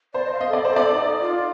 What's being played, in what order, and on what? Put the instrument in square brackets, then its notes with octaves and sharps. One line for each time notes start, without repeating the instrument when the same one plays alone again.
[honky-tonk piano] C5 [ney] D5
[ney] D#5
F5
[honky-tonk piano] D#5
[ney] A4 [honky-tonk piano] D5
[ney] A4 [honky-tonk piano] C5
[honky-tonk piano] D5
[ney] D#4
F4